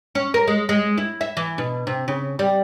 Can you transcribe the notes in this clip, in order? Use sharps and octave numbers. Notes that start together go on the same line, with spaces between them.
C#4
A#4
G#3
G#3
E4
E5
E3
B2
C3
C#3
G3